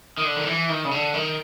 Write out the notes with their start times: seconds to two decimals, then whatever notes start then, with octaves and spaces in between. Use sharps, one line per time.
0.18 D#3
0.24 D3
0.37 D#3
0.47 E3
0.69 D#3
0.85 C#3
0.91 D3
1.14 D#3